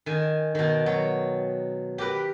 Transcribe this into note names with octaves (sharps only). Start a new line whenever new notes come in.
D#3 G#5
B2 D#3
F#3
G4 A#4 B4